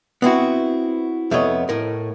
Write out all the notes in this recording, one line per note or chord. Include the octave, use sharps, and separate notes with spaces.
B3 C4 E4 F#4
F2 A3 B3 C#5 D#5
A2 A#4